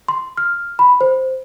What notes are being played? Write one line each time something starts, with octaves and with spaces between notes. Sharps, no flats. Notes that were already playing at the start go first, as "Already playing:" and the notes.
C6
F6
B5
C5